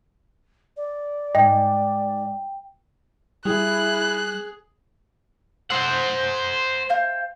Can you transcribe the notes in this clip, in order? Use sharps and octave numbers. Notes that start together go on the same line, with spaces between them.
D5
G#2 D#5 G5
G3 E4 G#4 F#6
C5 F#5 E6
C5 F5 G5